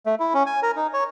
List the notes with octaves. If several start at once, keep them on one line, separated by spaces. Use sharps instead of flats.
A3
E4
C#4
G#5
A#4
D#4
C#5